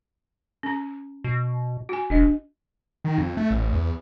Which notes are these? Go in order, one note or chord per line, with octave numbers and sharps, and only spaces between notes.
C#4 A#5
B2
F#4 G#5
E1 D4 D#5
D#3
F2
A3
A1
E2